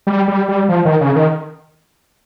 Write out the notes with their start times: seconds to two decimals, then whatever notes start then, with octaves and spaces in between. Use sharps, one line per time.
0.07 G3
0.28 G3
0.48 G3
0.69 F3
0.85 D#3
1.01 C#3
1.16 D#3